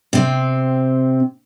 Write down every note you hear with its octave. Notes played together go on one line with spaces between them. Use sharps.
C3 C4